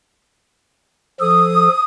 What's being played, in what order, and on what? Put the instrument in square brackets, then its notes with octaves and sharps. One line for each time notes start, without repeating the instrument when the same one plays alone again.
[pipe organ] F3 A4 [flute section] D#6